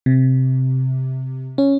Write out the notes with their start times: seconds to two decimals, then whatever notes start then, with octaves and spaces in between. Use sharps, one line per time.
0.06 C3
1.58 C#4